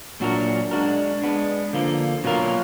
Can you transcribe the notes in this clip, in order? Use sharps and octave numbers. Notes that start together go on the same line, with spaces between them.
A#2 F#3 D4 F#4 A#4
G#3 D4 F#4 A#4
G#3 B3 D4
D3 F3 A#3
B2 F#3 A#3 F4 A#4